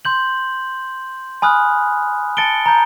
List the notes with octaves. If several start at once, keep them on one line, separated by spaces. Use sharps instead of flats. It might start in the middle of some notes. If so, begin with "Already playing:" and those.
C6 G6 F#7
G#5 B5 D#6 F6 F#6
A5 A6 C#7 D7 G7
A#5 G6